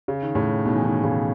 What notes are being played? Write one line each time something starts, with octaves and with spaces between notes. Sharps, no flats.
C#3
D#3
A2 C#3
B2 D#3
E3
B2 D#3
A2 C#3